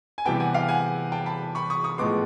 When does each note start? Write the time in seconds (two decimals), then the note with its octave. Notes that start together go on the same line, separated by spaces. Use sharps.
0.18 G#5
0.25 C3 E3 G3 B3 G5 A5
0.40 F#5 G#5
0.54 F5 G5
0.68 F#5 G#5
1.12 G5 A5
1.26 A5 B5
1.55 B5 C#6
1.70 C#6 D#6
1.84 C#6 D#6
1.98 A2 F3 G#3 B3 C6 D6